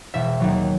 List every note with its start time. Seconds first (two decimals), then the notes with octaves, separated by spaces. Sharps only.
0.14 E1 E5
0.40 D#2 D#3 F#3